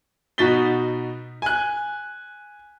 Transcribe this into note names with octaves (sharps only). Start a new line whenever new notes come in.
B2 D#4 F#4 A6 B6 G7
G#5 F#6